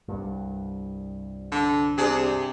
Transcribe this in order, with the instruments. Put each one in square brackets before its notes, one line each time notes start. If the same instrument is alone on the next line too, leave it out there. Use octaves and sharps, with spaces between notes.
[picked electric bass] C2 G2
[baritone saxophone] D3
[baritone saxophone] C3 [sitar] D4 G#4